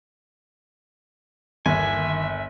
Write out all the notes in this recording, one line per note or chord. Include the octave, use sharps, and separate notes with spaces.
G1 D#2 E5 G#5